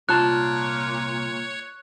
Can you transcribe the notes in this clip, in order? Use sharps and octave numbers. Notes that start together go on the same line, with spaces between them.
C2 A#2 F4 C#5 A5 F#6